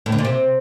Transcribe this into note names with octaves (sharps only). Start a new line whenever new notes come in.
A2
D3
A#2
C3